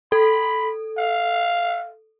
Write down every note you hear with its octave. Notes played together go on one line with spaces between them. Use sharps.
A4 B5
F5